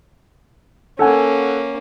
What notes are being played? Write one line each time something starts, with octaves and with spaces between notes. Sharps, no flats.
A#3 C#4 A4 F#5 G#5